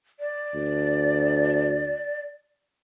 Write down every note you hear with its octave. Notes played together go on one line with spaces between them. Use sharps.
D5
D2